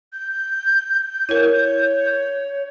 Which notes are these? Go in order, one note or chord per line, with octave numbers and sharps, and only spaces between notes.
G6
E4 A#4 C#5